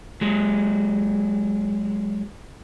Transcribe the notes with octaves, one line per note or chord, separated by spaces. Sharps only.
F#3 G#3